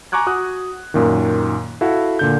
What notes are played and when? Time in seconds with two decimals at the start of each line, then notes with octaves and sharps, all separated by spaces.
0.12 G#5 A#5 C#6 D6 F#6 G#6
0.27 F#4 D#6 F#6
0.94 F#2 A#2 D#3
1.81 E4 F#4 A4 F5
2.19 A#2 D3 G6